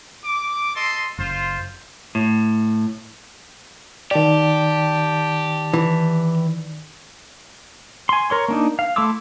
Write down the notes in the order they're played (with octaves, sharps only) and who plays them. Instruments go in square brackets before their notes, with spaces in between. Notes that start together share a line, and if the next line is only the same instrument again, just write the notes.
[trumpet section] D6
A4 D#5 C6
[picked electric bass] F#1 [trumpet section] F4 C5
[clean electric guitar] A2
[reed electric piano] D#3 D5 [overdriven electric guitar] G4 [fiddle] A5
[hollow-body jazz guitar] E3
[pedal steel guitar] G#5 C6
A#4 C#5 C6
A#3 D4 D#4
F5
A3 E4 C6 D6 E6